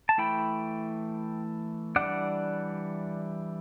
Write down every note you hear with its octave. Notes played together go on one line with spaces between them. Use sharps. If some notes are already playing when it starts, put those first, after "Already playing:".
A5
E3 A3 E4 G5 B5
E3 G3 D4 D5 F#5